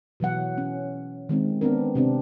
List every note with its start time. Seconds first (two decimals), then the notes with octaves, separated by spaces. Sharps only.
0.20 B2 E3 F#3 F#5
0.58 C#4
1.29 D#3 G#3 C4 D#4
1.61 B3 C4 D4 A#4
1.95 C3 C4 D4